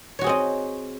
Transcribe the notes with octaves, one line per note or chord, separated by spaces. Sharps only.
C4 F#4 G#4 C#5 D#5